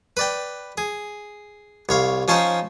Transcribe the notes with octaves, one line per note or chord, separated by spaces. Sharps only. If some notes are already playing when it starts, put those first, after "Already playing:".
B4 D5 G5
G#4
C2 C#5 F5
F3 C#4 D#4 C5 C#5